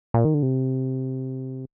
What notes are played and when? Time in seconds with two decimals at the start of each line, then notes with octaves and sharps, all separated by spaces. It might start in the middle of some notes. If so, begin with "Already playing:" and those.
0.14 A#2
0.25 D#3
0.34 D3
0.42 C3